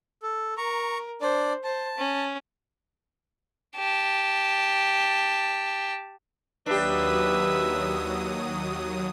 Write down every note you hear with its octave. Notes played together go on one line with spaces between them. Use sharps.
A4
A#4 A#5 C#6
D4 C5 D5
C5 A5
C#4
G4 A5
D#2 F#3 D4 G4 B4 E5 D#6